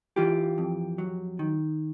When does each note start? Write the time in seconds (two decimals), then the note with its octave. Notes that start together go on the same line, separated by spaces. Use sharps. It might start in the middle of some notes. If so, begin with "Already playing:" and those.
0.16 E3 F4 G4
0.58 F2
0.98 F#3
1.39 D#3